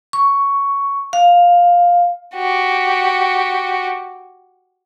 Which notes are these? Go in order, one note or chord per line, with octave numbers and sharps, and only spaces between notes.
C#6
F5
F#4 G4